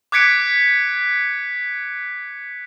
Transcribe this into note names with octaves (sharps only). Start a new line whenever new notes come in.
D6 F#6 G#6 B6 C#7 D7